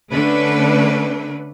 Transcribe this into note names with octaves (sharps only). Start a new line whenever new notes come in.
D3 A3 C#4 D4 B4